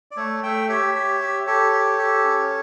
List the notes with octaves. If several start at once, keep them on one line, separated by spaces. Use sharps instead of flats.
D5
A3 A4 C#5
A3 E5 G5
G4 C#5 E5
G4
G4
G4 A4 C#5
G4
G4
C#4